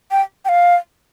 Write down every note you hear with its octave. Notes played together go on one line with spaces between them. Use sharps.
G5
G5
F5